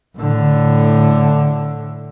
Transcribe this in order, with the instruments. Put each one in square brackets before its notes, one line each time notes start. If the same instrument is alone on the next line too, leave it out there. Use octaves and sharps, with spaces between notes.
[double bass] A2 D3